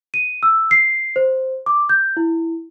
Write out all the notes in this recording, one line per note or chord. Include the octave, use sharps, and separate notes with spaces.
D#7
E6
C7
C5
D6
G6
E4